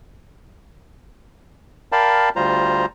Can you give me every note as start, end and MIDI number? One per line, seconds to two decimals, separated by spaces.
1.92 2.29 70
1.92 2.29 74
1.92 2.29 77
1.92 2.29 79
1.92 2.29 81
1.92 2.29 83
2.36 2.86 38
2.36 2.86 55
2.36 2.86 65
2.36 2.86 72
2.36 2.86 82